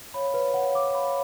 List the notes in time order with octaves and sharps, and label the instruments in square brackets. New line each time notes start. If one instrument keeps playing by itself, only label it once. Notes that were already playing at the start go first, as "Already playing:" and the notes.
[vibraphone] C#5 F5 [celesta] B5
[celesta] B4
[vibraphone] C#5 F5 [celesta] F#5
[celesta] D6
[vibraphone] C#5 F5 [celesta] B5